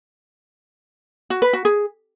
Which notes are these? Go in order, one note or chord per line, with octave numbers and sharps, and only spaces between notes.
F#4
B4
F#4
G#4